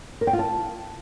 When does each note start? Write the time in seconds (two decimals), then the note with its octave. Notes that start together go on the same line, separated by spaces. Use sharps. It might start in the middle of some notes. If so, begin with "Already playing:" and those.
0.21 A#4
0.27 G5
0.33 F4
0.39 A5